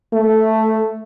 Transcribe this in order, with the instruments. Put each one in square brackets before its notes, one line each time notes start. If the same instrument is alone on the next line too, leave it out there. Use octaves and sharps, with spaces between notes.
[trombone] A3